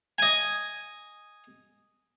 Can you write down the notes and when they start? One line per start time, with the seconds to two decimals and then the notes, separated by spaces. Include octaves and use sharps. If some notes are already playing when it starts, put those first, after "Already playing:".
0.18 D#5 G#5